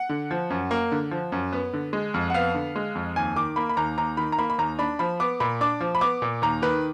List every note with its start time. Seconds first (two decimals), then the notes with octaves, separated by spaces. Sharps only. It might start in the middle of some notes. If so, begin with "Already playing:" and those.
Already playing: F#5
0.09 D3
0.31 F3
0.50 F#2
0.71 A#3
0.92 D3
1.11 F3
1.32 F#2
1.52 B3
1.73 D3
1.93 G#3
2.14 F2
2.30 F#5
2.34 B3 F5
2.54 D3
2.76 G#3
2.95 F2
3.16 D#2 G#5
3.36 D#3 D6
3.56 A#3 B5
3.69 B5
3.77 D#2 A#5
3.98 D#2 A#5
4.17 D#3 B5
4.32 A#5
4.38 A#3 B5
4.50 B5
4.58 D#2 A#5
4.79 D4 B5
4.99 F3 B5
5.20 B3 D6
5.40 A#2 B5
5.61 D4 D6
5.80 F3
5.95 B5
6.01 B3 D6
6.22 A#2
6.42 D#2 A#5
6.62 D#3 B4